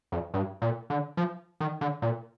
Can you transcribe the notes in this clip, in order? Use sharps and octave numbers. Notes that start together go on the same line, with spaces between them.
F2
G2
A#2
D3
F3
D#3
D3
A#2